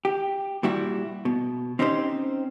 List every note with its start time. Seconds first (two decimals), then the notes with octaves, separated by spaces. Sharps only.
0.05 G4
0.63 A#2 G3 E4 F#4
1.25 B2
1.79 C4 C#4 D#4 G4 A#4 C5